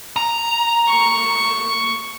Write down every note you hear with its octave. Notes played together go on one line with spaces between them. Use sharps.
A#5
C#6